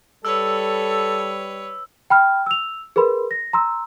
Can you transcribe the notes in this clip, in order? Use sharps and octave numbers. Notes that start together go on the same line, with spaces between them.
G3 A4 B4 C#5 E6
G5 B5 F6
E6 F7
G#4 A#4 B4 B5 C6
A#6
A#5 C6 E6